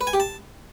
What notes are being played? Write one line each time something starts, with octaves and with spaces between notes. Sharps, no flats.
B4
G#5
G4
A5